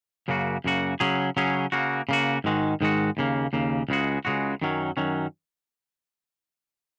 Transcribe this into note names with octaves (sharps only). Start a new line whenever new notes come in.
F#2 C#3 A#3 F#4
F#2 C#3 A#3 F#4
C#3 F#3 C#4 G#4
C#3 F#3 C#4 G#4
C#3 A#3 F#4
C#3 A#3 F#4
G#2 D#3 G#3 F#4
G#2 D#3 G#3 F#4
D#2 C#3 A#3
D#2 C#3 A#3
C#2 C#3 G#3 F#4
C#2 C#3 G#3 F#4
F#2 D#3 F#3 C#4
F#2 D#3 F#3 C#4